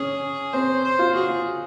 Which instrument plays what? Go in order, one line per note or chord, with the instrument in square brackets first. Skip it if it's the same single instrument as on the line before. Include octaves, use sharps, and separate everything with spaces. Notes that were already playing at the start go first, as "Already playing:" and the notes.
Already playing: [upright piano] C#4 [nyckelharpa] G#4
[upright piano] C4 [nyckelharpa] C5
[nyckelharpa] C5
[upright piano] F4
[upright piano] F#4 [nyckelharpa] G#4
[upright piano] F4